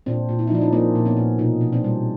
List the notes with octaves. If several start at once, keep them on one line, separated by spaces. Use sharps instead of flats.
A#2 C4 D4
A#2
E4
D#4
F3 D4
C#4 D#4
A#3 C4 D4
A#2
B3 C#4
A#2
B2 C#4 D#4
B2
C4 D4
G3